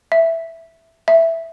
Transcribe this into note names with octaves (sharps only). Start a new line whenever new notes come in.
E5
E5